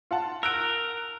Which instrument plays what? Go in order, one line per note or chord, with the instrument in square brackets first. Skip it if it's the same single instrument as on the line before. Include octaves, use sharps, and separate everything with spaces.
[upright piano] F4 F#5 A5
[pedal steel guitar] A#4 [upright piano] E6 F#6 D7